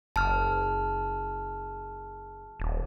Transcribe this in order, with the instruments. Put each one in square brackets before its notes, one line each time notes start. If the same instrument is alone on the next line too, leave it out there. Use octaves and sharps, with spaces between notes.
[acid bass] F#1 [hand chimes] A5 F6
[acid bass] D#1